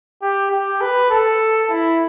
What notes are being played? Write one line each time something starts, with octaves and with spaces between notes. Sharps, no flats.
G4
G4
B4
A4
E4